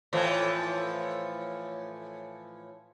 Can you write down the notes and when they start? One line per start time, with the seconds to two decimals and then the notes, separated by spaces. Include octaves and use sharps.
0.13 A2 E3 F3